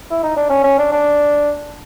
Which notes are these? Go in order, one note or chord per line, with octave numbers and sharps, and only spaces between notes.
E4
D#4
D4
C#4
C#4
D4
D4